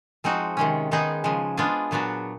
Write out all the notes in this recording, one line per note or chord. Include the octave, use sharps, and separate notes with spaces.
F3 G#3 C4 D#4 F#4
C3 D#3 G#3 C#4
D#3 G#3 B3 D#4 G#4
C#3 F3 G#3
G#3 B3 D4 F4 G#4
A#2 F#3 B3 D4 F#4